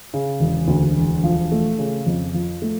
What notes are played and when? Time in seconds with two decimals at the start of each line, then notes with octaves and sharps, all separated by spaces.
0.14 C#3
0.40 E1
0.68 D2
0.96 E1
1.24 F3
1.52 A3
1.79 C#3
2.06 F2
2.34 F3
2.62 A3